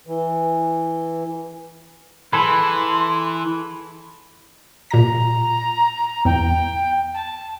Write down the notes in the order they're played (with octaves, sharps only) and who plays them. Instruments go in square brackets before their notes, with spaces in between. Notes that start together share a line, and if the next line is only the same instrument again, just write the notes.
[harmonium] E3
[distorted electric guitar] E3 [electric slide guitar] G#4 A4 B4 [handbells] B5 [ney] C6
[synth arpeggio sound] A#2 A#6 [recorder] A#5
[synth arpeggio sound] E2 [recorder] G5
[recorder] A5